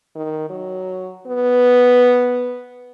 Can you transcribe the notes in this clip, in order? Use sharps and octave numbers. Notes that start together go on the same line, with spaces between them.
D#3
F#3
B3